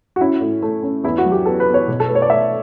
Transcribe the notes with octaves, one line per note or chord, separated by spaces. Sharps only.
F#4
C#4 E4
A2
A3
C#4
E2 E4
F#4
F#3
G4
B3 A4
B4
B3
C#5
B2
A4
A3 B4
C#5
D5
A3 E5